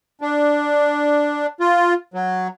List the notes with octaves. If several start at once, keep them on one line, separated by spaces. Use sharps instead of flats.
D4
F4
F#3